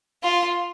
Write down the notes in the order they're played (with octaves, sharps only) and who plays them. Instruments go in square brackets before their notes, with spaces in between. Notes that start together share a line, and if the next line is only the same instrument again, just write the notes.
[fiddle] F4